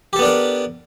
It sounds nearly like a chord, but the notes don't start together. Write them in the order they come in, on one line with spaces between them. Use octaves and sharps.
G4 A4 B3 D4 A#4